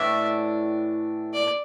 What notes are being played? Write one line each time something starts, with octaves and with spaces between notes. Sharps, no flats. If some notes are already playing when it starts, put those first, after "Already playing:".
Already playing: A2 E3 D4 E5
D5